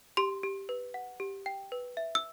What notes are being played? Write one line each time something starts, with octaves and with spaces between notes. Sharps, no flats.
G4 C6
G4
B4
F#5
G4
G5
B4
E5
E6